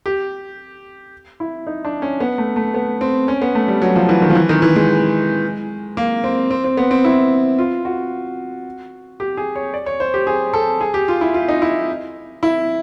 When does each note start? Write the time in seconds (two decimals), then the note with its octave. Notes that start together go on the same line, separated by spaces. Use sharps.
0.06 G4
1.40 E4
1.67 D#4
1.85 D4
2.02 C#4
2.20 B3
2.38 A3
2.56 A3
2.74 B3
3.01 C4
3.28 C#4
3.42 B3
3.55 A3
3.68 G3
3.82 F#3
3.96 F3
4.09 E3
4.22 D#3
4.30 F3
4.35 E3
4.49 D#3
4.62 E3
4.76 G#3
5.97 A#3
6.24 C4
6.51 C4
6.64 C4
6.77 B3
6.91 C4
7.04 E4
7.58 F4
7.85 F#4
9.20 G4
9.37 G#4
9.56 C#5
9.74 D5
9.86 C#5
10.00 C5
10.14 G4
10.27 G#4
10.54 A4
10.81 G#4
10.94 G4
11.08 F4
11.21 E4
11.34 F4
11.49 D#4
11.62 E4
12.43 E4